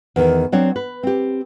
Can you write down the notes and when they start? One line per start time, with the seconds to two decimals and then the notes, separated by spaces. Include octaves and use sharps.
0.16 E2 D#3
0.52 F#3 C4 D4 C#5
0.76 B4
1.03 C4 G4